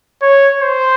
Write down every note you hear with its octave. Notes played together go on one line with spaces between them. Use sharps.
C#5
C5